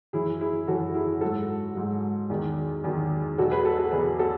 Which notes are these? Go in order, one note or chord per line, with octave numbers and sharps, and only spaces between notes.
F#2 E3 E4 G#4
E4 G#4
F#2 E3 F#4 A4
E4 G#4
G#2 F#3 F#4 A4
G#2 F#3
E2 D#3 F#3
E2 D#3 F#3
E2 B2 F#3 F#4 A4
G#4 B4
F#4 A4
F#4 A4
E2 B2 F#3 G#4 B4
F#4 A4